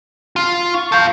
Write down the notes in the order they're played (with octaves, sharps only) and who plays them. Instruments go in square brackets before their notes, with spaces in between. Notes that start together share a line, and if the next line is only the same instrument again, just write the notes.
[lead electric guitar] F4
[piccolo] C#6
[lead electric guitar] A4 F5 [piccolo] G6